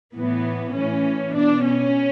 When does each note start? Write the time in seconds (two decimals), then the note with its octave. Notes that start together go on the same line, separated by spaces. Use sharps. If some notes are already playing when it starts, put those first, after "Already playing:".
0.16 A2 E3 B3
0.75 A2 E3 C#4
1.35 B2 D4
1.64 C#4